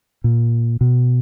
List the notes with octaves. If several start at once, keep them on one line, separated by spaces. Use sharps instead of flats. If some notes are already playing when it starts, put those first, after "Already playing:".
A#2
B2